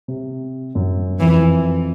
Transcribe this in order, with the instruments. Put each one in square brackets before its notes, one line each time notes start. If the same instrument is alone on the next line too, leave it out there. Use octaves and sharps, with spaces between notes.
[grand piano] C3
F#2
[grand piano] F2 [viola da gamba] E3